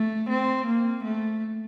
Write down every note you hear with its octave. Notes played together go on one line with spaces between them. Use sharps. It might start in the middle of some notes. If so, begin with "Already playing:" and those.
Already playing: A3
C4
A#3
A3